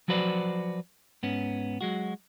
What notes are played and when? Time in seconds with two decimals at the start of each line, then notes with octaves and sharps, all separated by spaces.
0.08 F3 F#3 F#4 B4 C5 D5
1.23 G#2 B3 C#4
1.81 F#3 G#3 F#4